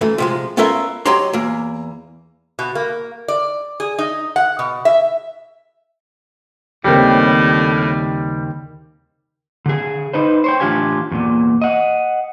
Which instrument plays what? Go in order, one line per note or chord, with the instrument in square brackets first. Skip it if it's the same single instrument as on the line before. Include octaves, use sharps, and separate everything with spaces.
[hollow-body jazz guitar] F#2 E3 A3
C3 F3 G#3
B3 C#4 F4 A4 A#4 E5
F#3 G4 C#5 D#5 A#5 C6
E2 A#3
[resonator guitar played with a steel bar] B2
A#3
D5
G#4
D#4
F#5
B2
E5
[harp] D#2 C#3 [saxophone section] A2 [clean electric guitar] G3 [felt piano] A#3 C4 G4
[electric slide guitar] D3 G#4
D#4 B4 C5
C5 C#5 G5
A2 E3 D4 F4 G4 G#5
E2 A#2
D#5 F#5